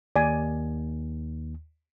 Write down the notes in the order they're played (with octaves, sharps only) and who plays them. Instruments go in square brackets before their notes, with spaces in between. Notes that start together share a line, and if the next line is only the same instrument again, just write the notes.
[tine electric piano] D#2 [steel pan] D5 G#5